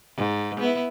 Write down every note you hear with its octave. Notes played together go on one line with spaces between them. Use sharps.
G#2
B3 E4